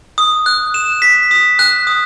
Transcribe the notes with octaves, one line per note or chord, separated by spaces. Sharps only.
D#6
F#6
E7
B6
D#6
F#6
D#6